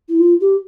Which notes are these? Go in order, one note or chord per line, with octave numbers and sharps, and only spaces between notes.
E4
F4
G4